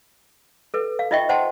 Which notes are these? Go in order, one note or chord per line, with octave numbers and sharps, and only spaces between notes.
A4 B4
F5
D#4 F4 D#5 E5 G5 C#6
C5 F#5 G5 A5 C6